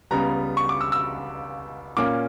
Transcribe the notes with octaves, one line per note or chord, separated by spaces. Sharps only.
C#2 C#3 G3 B3 A#5
C#6
D6
E6
E6
A#2 A#3 C#4 D6